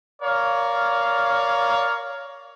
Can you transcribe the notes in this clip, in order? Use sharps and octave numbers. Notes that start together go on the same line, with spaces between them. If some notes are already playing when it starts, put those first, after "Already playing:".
A#4 C#5 D5 F5